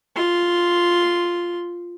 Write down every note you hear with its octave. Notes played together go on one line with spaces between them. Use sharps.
F4 C6